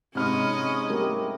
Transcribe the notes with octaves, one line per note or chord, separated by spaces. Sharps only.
G#2 C3 C#4 D#5 B5 C#6 F6
A3 G4 A#4